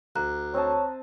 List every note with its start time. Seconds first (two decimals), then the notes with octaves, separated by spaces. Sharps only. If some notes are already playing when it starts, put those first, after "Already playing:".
0.16 D2 A#5 F#6
0.54 C4 C#5 D#5 A5